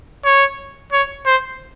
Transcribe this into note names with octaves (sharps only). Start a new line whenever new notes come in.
C#5
C#5
C5